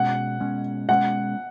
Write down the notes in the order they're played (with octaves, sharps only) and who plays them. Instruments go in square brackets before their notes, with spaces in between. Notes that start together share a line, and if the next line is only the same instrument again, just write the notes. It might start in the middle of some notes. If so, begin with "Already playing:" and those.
Already playing: [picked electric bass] B2 G#3 C#4 [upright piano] F#5
[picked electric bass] B2 G#3 C#4
[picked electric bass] B2 G#3 C#4 [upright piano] F#5